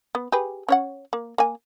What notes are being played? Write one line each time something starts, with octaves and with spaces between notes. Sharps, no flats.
B3
G4 G#4 B4
C#4 C#5 F#5
A#3
A#3 G#5